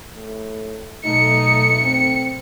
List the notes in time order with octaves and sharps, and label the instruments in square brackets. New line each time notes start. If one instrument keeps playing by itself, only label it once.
[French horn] A2
[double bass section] B1 A3 [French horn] D#4 [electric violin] C#7
[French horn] C4